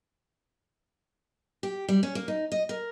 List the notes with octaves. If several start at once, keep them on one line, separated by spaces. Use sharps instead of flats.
G4
G3
C#4
A#3
D#4
D#5
A#4